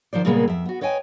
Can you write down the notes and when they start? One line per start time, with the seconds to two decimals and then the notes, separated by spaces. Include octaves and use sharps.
0.13 D#3 F3 C5 D5
0.25 A#2 C#3 G3 G#3 A#3 B3
0.48 F2 E5
0.65 B3 F#4
0.81 B4 C#5 D#5 G5 G#5